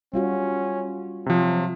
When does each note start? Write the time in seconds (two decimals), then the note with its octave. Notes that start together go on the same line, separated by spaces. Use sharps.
0.14 G3 C#4 F4 F#4
1.26 C3 F3 F#3